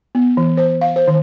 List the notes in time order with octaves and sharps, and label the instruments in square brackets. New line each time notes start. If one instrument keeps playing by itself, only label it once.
[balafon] B3
E3
C5
F5
C5
D#3